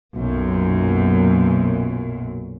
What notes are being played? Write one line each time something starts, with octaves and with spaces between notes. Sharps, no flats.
B1 F#2 A#2